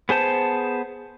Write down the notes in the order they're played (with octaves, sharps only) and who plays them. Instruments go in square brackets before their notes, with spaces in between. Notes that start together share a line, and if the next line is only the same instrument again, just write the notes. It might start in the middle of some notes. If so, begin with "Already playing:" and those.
[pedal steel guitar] B3 G#4 C5 A5